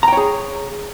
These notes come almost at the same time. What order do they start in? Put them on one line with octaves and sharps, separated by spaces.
A#5 G5 C#5 G#4